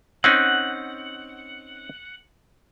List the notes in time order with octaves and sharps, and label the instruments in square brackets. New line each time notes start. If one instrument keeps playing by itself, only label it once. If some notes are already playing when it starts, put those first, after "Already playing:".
[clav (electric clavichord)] C4 C#4 D#4 [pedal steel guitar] F#5